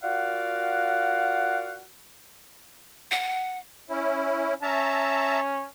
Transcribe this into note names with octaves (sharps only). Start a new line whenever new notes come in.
F4 F#4 A#4 D5 F5 F#5
F#5
C#4 E4
C#4 E5 A5 A#5